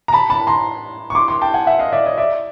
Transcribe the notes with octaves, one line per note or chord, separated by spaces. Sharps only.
A#5
A5 B5
A5 B5
A#5 C6
C#6
C6 D6
C6 D6
G5 A5
F#5 G#5
E5 F#5
D#5 F5
D5 E5
C#5 D#5
D5 E5